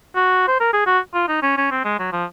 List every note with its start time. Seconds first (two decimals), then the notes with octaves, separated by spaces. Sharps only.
0.16 F#4
0.48 C5
0.60 A#4
0.73 G#4
0.86 F#4
1.14 F4
1.28 D#4
1.42 C#4
1.57 C#4
1.71 C4
1.85 G#3
1.99 F#3
2.12 F3